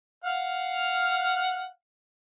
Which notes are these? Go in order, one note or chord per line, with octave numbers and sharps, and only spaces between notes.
F5 F#5 F6